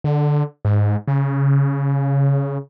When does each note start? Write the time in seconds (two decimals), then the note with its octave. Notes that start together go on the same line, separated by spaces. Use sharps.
0.04 D3
0.65 G#2
1.08 C#3